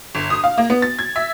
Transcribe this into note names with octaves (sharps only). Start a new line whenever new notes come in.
G1
D#6
F5
A#3
B3
A6
G#6
E5